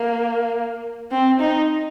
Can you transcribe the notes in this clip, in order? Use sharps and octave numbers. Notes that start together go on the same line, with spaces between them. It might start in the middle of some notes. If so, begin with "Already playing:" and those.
Already playing: A#3
C4
D#4